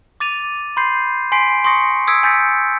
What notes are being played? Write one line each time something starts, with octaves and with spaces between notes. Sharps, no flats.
D6 A6 D#7 F7
B5 C6 G6 C7
G#5 C6 B6 C7 D7
C6 C#6 D#6 A#6 C#7
D#6 E6 G#6 B6 C#7 D7
G#5 G6 A6 B6 C#7